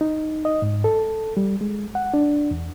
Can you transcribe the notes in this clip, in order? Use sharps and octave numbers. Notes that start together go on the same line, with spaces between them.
D#4
D#5
G#2
A4
G3
G#3
F#5
D4
E2